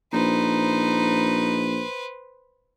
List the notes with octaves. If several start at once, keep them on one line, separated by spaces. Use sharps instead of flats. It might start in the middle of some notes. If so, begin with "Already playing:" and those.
A#1 D#4 B4 C5